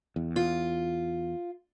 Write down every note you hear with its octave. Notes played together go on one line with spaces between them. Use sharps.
E2
F4